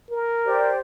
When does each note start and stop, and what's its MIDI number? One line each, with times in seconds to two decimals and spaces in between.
0.10 0.70 70
0.45 0.78 67
0.45 0.78 72
0.45 0.78 74